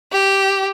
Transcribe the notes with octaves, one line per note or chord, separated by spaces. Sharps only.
G4